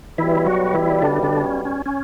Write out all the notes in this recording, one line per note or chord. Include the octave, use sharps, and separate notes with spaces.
B1 B2 E3 G3 E4
F#3 F#4
E3 E4
D3 D4
D3 D4
C#4
C#4
C#4